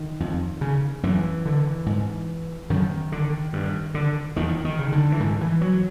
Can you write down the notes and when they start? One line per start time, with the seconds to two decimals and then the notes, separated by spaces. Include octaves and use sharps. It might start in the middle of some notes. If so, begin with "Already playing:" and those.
Already playing: D#3
0.20 F2
0.61 C#3
1.03 F#2 E3
1.46 D3
1.86 G#2
2.70 F#2 D#3
3.12 D3
3.53 G2
3.94 D3
4.36 E2 D#3
4.65 D#3
4.79 C#3
4.92 D3
5.12 E3
5.20 G#2 D#3
5.41 E3
5.61 F#3